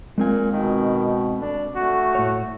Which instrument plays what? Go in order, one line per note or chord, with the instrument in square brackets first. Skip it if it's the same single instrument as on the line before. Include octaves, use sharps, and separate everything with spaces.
[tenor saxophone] A#2 [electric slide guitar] G#3 C4 G#5
[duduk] B2 [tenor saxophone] D#3
[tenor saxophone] D4
[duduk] A3 [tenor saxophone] F#4
[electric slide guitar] A2 C#5